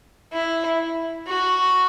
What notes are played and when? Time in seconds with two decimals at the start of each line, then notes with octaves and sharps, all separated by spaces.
0.33 E4
1.28 F#4